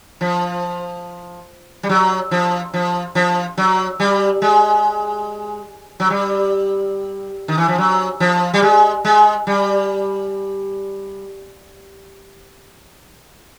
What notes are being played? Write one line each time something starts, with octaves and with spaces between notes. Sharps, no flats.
F3
G3
F#3
F3
F3
F3
F#3
G3
G#3
F#3
G3
D#3
E3
F3
F#3
F3
G3
G#3
G#3
G3